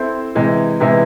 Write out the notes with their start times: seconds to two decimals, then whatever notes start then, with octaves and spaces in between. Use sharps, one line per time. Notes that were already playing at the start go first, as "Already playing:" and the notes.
Already playing: C4 E4 A4 C5
0.35 C3 E3 G#3
0.80 C3 E3 G#3 B3 E4